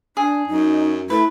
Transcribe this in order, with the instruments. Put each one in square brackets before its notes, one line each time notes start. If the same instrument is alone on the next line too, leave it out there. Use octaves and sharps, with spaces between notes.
[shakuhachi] D4 [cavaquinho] G#4
[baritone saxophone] F#2 [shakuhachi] D#4
[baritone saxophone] A3 [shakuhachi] E4 [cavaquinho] B4